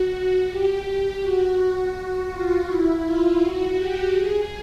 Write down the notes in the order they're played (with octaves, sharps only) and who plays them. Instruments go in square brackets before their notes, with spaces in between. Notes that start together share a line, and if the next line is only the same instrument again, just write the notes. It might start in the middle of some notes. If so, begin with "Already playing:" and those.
Already playing: [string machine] F#4
G4
G4
F#4
F#4
F4
E4
F4
F#4
G4
G#4